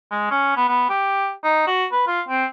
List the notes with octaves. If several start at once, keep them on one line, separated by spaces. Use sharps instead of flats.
G#3
C#4
B3
B3
G4
D#4
F#4
B4
F4
C4